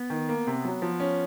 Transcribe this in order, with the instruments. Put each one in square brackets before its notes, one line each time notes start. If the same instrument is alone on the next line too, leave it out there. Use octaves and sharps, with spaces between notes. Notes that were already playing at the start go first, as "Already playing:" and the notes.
Already playing: [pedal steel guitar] B3
[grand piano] D#3
A#3
C3
F#3
F3
C#4